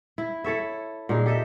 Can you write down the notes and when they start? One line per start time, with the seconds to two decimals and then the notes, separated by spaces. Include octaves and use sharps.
0.18 E4
0.44 E4 A4 C#5 E5
1.09 A#2 D#4 G#4
1.26 G4 A4 D#5 E5